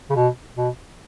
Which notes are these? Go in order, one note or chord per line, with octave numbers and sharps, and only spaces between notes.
C#3
B2
B2